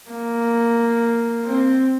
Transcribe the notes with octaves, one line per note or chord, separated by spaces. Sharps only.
A#3
C4